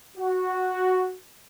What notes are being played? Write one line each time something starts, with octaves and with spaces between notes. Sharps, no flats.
F#4